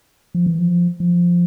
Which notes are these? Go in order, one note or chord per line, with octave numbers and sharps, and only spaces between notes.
F3
E3
F3
F3